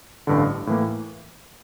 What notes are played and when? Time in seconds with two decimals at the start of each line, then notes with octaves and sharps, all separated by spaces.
0.27 A1 G2 D3
0.67 A2 E3 A#3